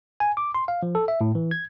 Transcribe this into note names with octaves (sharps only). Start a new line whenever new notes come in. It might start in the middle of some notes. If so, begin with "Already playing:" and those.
G#5
D6
C6
F5
F3
A4
E5
A2
E3
G#6